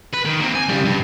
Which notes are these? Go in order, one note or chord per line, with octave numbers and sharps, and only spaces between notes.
B4
D#3
A#3 C4
G#5
C#3 G3
G2